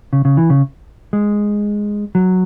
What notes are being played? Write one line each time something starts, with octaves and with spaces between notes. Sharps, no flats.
C#3
C#3
E3
C#3
G#3
F#3